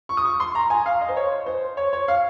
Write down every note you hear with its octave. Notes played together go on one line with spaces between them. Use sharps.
C#6
D#6
C#6
C6
A#5
G#5
F5
D#5
C5
C#5
C5
C#5
C#5
F5